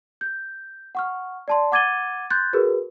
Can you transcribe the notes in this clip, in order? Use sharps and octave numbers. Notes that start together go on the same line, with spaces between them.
G6
F#5 C#6 F6
D5 A5 C6
F#5 D6 G#6 A6 D#7 G7
C6 F#6 G6 A6
F#4 G#4 A#4 B4